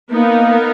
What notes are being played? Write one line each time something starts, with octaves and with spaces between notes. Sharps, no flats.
A#3 B3 D#4 A#4